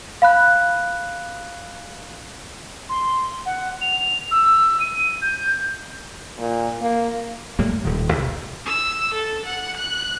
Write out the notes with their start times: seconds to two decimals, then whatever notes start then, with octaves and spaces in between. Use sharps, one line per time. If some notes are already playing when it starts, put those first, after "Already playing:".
0.22 F5 B5 F#6
2.89 C6
3.46 F#5
3.81 F7
4.31 E6
4.80 D#7
5.22 G6
6.38 A#2
6.81 A#3
7.59 A2 G3 A#3
7.85 D#1 D#3
8.13 C2
8.66 E6
9.14 A4
9.46 F#5
9.77 F#6